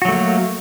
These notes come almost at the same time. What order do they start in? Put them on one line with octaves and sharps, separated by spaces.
F#4 F#3 A3 A#3